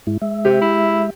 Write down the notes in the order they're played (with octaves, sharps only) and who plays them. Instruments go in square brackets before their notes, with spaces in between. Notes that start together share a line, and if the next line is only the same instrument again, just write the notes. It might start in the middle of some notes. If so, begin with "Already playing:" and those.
[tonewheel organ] G#2 G#3 E4
G#3 E5
[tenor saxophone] C3 [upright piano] G4
[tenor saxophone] E4